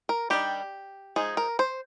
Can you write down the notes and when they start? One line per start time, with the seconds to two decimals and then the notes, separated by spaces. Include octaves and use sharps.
0.09 A#4
0.30 D#3 G3 D4 G4
1.16 F3 G#3 D#4 G#4
1.37 A#4
1.59 C5